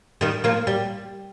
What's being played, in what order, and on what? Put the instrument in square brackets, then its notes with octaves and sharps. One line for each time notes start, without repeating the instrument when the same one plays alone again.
[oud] D#3 G3
F3 A#3
G3